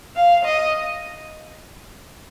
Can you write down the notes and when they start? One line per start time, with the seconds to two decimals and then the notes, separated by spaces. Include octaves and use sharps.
0.17 F5
0.46 D#5